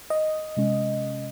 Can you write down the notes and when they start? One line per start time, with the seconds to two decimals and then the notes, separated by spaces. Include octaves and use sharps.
0.10 D#5
0.57 C3 G#3 C#4